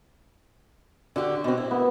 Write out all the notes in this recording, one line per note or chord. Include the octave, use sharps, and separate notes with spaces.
D3 F#4 G4
B2 C4
E4
B3